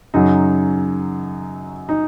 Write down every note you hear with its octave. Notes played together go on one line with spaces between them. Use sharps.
F#2 C#3 F#3 D#4
D#4